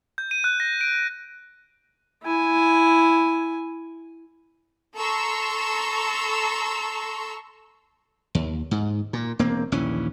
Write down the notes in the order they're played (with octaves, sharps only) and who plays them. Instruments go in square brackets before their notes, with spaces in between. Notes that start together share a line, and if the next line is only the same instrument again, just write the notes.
[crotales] G6
D#7
F#6
A#6
D7
[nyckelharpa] E4 G#5
[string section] A4 A#5 C6 C#6 E6
[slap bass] D#2
G#2
A#2
E1 A#3 C4
A#1 D#2 E3 C#4